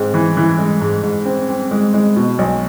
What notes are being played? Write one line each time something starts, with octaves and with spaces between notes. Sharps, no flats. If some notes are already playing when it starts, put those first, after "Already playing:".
Already playing: G#2 G#3 C4
E3
E3
G#3
G#2
G#2
C4
C4
G#3
G#3
B2
B1